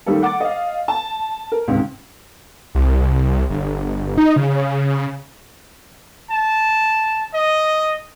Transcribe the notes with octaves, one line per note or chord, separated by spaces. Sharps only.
D#3 G3 A3 A#3 A4
F#5 D6 A6
D#5 F5
A5
A#4
C#2 G#2 C3 D#3
C2
G1
D#4
C#3
A5
D#5